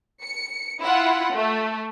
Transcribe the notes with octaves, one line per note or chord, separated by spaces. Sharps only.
C#7
E4 F4 F#5
A3